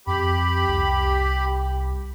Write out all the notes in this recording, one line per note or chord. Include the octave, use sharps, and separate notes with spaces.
F2 G4 B5
C2